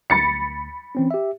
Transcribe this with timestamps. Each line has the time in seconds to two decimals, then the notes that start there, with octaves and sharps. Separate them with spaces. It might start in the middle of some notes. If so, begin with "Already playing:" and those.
0.10 D2 B5 A6 C#7
0.95 E3 C4 C#4
1.11 G4 E5